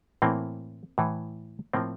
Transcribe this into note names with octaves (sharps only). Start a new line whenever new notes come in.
A2 E3 A#3 C4
A2 E3
A2 F3 A#3 C4